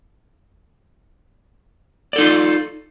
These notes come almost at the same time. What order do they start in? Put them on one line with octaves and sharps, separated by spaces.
D5 A4 D#4 F4